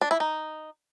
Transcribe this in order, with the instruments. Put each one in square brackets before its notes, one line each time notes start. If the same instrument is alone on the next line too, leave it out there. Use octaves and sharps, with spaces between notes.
[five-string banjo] D4
E4
D#4